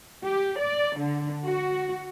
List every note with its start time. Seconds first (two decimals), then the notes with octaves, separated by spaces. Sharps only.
0.24 G4
0.59 D5
0.98 D3
1.44 F#4